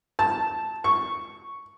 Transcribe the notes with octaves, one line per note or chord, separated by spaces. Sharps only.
A5
C#6